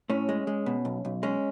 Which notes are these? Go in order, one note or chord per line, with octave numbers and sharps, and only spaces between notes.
A2 C#4
G#3
G#3
B2
B1
B1
G#3 C#4